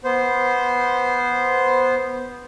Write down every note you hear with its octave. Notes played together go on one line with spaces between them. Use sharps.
B3 C5